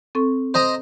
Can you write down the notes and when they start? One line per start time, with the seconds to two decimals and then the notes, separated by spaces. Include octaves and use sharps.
0.15 C4 A4 C#6
0.54 C5 D#5 A#5